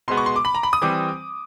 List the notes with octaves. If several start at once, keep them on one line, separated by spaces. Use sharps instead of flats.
B2 G#3 B3 C6
C#6
C6
D6
B5
A#5
B5
D#6
E3 G3 C4 D6